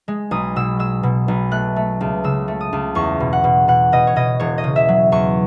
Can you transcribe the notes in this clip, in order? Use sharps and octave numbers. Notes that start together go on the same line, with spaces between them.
G#3
B1 D#6
B2 E6
G#3 E6
B2
B1
A3 F#6
A3
C#2
C#3 E6
A3
D#6
C#2
E2 C#6
B2
F#5
B2
B2 F#5
B2 D#5
C#5
B2 D#5
E1 C#5
D#5
C#3
E5
F#3
E2 C#6